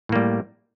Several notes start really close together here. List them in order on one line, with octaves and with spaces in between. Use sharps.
A2 A#3 G3